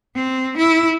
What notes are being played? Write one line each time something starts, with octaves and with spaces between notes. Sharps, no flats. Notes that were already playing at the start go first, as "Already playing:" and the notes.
C4
E4